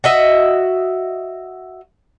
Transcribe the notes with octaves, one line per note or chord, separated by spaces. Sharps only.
F#4 D#5 E5